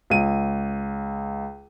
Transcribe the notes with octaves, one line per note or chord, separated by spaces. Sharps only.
C#2 D#7